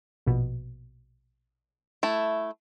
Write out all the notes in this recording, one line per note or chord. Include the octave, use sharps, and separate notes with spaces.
A#1 B2
A3 E4